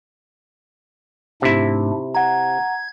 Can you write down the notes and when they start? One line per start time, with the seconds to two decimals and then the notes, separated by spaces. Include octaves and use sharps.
1.42 G#2 C3 A3 D4 E4
2.15 F#5 A#5 G#6